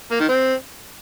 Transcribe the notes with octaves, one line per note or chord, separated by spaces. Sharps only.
A#3
D#3
C4